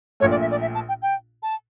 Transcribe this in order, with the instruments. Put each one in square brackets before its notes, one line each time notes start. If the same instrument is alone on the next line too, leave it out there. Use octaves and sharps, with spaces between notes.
[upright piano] A#1 A#2 A3 [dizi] C#5
[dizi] D5
E5
D5
E5
A5
G5
G5
A5